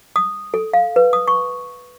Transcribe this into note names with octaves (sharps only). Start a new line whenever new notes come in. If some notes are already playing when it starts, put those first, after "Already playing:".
D#6
A4
F5
B4
D#6
C#6